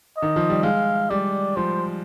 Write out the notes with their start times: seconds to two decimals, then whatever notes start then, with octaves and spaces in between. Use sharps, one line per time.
0.17 D#5
0.22 D#3
0.36 F3
0.50 G3
0.63 G#3 F5
1.10 G3 D5
1.57 F3 C5